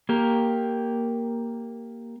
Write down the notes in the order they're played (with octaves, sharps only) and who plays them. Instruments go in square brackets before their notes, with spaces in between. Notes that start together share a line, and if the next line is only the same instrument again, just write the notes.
[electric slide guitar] A#3 G4 A#4